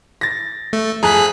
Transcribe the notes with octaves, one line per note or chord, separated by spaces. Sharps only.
A6 A#6
A3
F2 G#4 G#5 A#5 F#6 B6